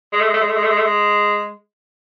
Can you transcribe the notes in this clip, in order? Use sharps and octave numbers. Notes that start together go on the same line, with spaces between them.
G#3
A3
G#3
A3
G#3
A3
G#3
A3
G#3
A3
G#3